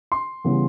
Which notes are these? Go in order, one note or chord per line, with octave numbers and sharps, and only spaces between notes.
C6
C#3 E3 G3 B3